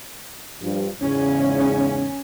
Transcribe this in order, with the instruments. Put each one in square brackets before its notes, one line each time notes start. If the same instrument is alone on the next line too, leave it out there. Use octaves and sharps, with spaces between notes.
[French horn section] G2 F3
[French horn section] E2 G#2 C#3 [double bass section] C#4